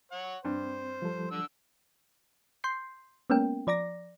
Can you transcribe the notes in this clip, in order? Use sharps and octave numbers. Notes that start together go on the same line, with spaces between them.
C#5 F#5
G2 C4 C5
F3 G3 A4
D3 E6
C6 G6 C7
G#3 A#3 B3 C#4 A#4 G5
F3 D5 A#5 D6 A#6